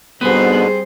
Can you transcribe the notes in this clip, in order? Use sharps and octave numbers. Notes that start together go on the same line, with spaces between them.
G#2 B2 D3 G3 B3 C4 G#4 C5